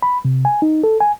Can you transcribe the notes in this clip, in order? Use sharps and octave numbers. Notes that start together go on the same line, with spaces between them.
B5
C3
G#5
D#4
A4
G#5